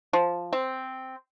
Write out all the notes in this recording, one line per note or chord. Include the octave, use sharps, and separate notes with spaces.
F3
C4